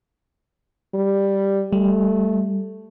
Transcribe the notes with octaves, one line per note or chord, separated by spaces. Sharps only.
G3
G3 A3